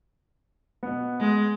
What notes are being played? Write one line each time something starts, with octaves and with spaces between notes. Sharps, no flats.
B2 B3
G#3